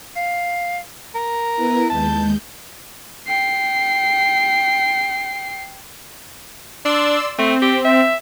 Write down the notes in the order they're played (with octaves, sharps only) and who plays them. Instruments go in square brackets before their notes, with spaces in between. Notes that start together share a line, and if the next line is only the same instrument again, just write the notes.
[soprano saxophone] F5
A#4
[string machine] B3 E4 B4
[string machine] D#2 G#3 G6 [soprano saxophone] A5
[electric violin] G5 C7
[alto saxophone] D4 [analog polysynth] D5 C6 E6
[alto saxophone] A3 [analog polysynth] C4
[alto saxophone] G4
E5